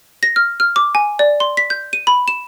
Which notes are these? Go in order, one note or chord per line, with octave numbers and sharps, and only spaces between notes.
A#6
F6
F6
D6
G#5
D5
C6
B6
G6
D#7
B5
E7